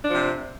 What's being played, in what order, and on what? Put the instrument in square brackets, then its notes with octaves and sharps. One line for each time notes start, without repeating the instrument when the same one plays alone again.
[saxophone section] D4
F3
C3